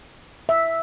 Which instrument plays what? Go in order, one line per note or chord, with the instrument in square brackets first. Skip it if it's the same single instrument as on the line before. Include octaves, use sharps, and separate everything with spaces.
[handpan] E5